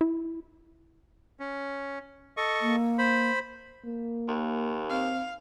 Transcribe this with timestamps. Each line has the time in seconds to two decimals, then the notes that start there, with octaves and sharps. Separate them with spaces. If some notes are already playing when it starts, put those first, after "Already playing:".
0.01 E4
1.40 C#4
2.37 A4 D#5 C#6
2.61 A#3
2.98 C5 B5
3.85 A#3
4.28 D#2
4.90 C4 F5